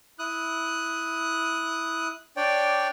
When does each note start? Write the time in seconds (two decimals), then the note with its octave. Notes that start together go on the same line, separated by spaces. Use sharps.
0.19 E4 D#6 F#6
2.37 D4 C#5 D5 G5